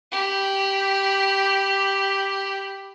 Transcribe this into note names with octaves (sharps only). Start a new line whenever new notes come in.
G4 B5